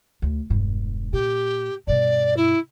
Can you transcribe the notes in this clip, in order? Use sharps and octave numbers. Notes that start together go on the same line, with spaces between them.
D2
E1 G2
A#2 G4
G2 B2 D5
E4